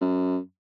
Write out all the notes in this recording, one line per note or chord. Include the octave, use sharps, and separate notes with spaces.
F#2